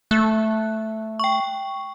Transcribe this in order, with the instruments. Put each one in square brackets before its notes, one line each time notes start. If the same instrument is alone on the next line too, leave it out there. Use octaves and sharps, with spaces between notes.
[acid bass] A3 [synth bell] F#6
[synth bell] G5 C#6